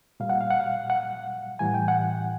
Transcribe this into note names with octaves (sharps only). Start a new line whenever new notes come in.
A#2 G3 F5
F#5
F5
F#5
F5
F#5
A2 E3 G3 G#5
G5
F#5